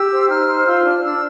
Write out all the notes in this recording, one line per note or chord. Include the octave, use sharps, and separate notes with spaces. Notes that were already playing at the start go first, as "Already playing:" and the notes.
Already playing: G4 E6
C5
D#4 F6
C5
F4 E6
D4 F6
D4 E6